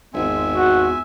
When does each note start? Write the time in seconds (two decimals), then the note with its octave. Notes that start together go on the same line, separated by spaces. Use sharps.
0.14 G#1 E2 F4 E5 G#5
0.53 F#4